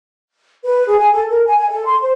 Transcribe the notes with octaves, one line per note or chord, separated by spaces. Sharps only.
B4
G#4
G#5
A4
A#4
G#5
G#5
A4
C6
C5